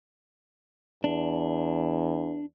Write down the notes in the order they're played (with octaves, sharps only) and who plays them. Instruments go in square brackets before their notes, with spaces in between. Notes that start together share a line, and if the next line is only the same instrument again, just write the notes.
[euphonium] E2 [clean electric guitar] D4